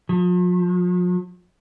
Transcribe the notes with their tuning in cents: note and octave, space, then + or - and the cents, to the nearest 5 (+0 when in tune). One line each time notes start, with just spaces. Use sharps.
F3 +45